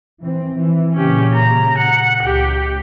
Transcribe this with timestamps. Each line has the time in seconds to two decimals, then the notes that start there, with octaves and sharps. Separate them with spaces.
0.21 E3 C4
0.55 E3
0.94 A#2 C#3 C#4 G4
1.34 A#5
1.78 F#5
2.23 C#2 G4